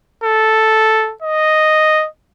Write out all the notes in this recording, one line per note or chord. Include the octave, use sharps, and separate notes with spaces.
A4
D#5